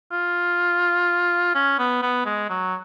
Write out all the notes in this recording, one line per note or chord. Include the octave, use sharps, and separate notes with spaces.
F4
C#4
B3
B3
G#3
F#3